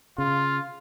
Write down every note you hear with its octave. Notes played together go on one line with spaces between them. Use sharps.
C#3 F4